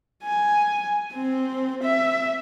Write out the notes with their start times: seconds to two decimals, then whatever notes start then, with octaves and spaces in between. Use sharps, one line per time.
0.25 G#5
1.12 C4
1.83 E5